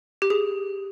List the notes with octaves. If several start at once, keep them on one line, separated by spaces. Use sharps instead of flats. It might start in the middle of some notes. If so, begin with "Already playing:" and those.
G4
G#4